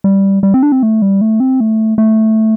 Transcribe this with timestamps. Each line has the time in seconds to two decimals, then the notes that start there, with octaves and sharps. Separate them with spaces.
0.04 G3
0.43 G3
0.54 C4
0.63 D4
0.72 C4
0.83 A3
1.02 G3
1.21 A3
1.40 C4
1.60 A3
1.98 A3